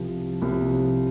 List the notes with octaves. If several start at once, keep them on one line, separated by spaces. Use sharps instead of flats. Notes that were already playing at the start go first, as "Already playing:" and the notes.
Already playing: C2 C3 F3
C2 C3 F3